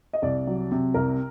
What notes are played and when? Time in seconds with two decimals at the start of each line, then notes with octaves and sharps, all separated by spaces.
0.13 D#5
0.22 C2 D5
0.47 F#3
0.71 C3
0.94 C2 A#4